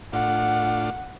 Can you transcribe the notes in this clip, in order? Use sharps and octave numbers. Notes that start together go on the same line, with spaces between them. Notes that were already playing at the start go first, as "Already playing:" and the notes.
A2 D4 F4 F#5